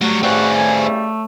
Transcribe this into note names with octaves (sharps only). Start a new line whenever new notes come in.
F#3 G3 A3 F#4 C#5
C#3 E3 G3 C4 F#4 G#4
A4 G#5
A3